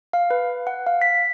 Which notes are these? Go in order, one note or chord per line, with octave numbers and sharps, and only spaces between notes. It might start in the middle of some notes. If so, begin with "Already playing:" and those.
F5
B4
F#5
F5
B6